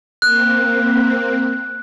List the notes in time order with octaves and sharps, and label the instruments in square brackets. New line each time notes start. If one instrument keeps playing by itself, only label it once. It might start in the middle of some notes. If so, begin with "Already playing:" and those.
[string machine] A#3 C4 [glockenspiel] F#6